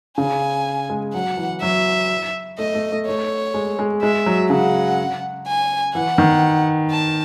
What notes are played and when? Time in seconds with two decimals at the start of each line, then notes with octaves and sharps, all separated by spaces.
0.18 C#3 G#5
0.90 G#3
1.14 F#3 F#5
1.37 E3
1.62 F#3 E5
2.59 A3 D#5
2.75 A3
2.92 A3
3.06 A3 C#5
3.54 G#3
3.79 G#3
4.02 G#3 E5
4.26 F#3
4.50 C#3 F#5
5.47 G#5
5.95 E3 F#5
6.18 D#3
6.91 A5